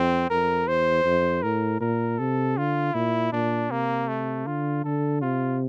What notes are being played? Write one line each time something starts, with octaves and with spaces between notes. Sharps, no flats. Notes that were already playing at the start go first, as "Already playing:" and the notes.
Already playing: F2 C4
F2 A#4
E2 C5
F2
A2 A#4
A#2 A#4
C3 A4
D3 F4
A#2 E4
A#2 D4
C3 A#3
A3
D3 F4
D3 A4
C3 F4